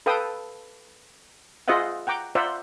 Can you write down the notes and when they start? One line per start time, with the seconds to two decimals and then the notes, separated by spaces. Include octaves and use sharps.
0.06 A4 B4 F5 G5 A5 D#6
1.68 F4 G#4 C5 D#5 E5 F#5
2.07 F#5 G5 A#5 D6
2.35 F4 C5 D5 E5 F#5 A#5